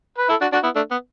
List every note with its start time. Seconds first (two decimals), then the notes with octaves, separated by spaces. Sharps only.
0.18 B4
0.29 E4 A4
0.41 D4 F#4
0.52 D4 F#4
0.63 B3 E4
0.76 A3 D4
0.91 B3